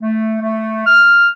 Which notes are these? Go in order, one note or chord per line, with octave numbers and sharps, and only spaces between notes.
A3
A3
F6